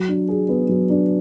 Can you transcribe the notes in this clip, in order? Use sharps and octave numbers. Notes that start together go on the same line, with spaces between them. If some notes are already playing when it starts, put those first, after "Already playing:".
Already playing: F#3
D4
G#4
B3
F#3
D4